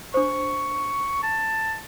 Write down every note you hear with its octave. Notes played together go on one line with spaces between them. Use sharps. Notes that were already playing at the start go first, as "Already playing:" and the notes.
D4 C5 C#6
A5